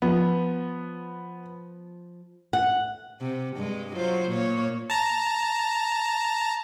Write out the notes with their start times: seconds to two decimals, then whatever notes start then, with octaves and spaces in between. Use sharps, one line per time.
0.02 F3 B3
2.53 F#5
3.21 C3
3.57 G2 G#3
3.93 F#3 F4 C5
4.29 A#2 A#3 C#5
4.90 A5 A#5